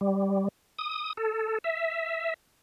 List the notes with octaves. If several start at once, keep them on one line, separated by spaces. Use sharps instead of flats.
G3
D#6
A4
E5